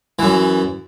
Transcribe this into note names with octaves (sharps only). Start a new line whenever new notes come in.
F#2 E3